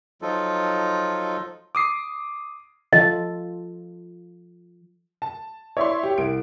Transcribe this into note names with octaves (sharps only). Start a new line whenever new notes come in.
F3 F#3 D#4 F4 A4
D6 D#6 C7
F3 F4 A4 D#5
A5
E4 C#5 D5 E5 C6
G4
C2 D7